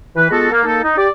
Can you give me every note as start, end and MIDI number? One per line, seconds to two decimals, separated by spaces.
0.16 0.26 52
0.16 0.26 71
0.31 0.49 56
0.31 0.49 59
0.31 0.49 65
0.31 0.49 66
0.31 0.49 69
0.51 0.60 58
0.64 0.82 58
0.64 0.82 63
0.64 0.82 69
0.84 0.95 63
0.97 1.08 67
0.97 1.08 74